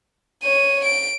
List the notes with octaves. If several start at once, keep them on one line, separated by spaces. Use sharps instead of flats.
C#5 D#7
D7